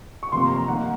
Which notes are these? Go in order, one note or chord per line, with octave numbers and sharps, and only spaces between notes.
C#6
C3 F3 A#3 C6
A#5
A#5
D#3 A#3 F#5